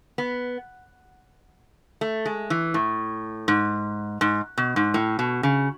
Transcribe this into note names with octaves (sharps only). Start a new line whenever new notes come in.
B3
A3
G#3
E3
A2
G#2
G#2
B2
G#2
A2
B2
C#3